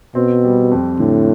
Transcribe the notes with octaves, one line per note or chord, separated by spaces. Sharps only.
B2 C4
G3
F2
A2 D3